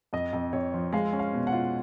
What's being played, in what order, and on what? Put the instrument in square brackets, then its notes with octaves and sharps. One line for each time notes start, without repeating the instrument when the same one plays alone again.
[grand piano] F2 D#5
F2
F2 C#5
F3
G#3 F5
C#4
F5
B2
F#5
F4